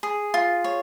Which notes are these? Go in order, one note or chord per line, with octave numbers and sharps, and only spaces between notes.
G#4
F4
C#5